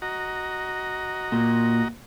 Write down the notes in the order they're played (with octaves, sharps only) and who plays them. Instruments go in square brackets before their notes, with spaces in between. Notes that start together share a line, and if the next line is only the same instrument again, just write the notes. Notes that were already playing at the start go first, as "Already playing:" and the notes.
[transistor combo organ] F#4 D#5 A#5
[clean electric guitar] A#2